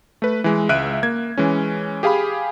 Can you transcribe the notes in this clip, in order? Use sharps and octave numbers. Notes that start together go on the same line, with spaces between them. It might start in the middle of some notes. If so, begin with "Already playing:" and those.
A3 B4
E3 G#3
C#2 E5 F#6 D7 D#7
A#3 G#6
E3 G#3 C#4
G4 G#4 F5 G#5 B5